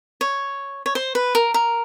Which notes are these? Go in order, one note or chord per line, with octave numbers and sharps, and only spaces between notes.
C#5
C#5
C5
B4
A#4
A#4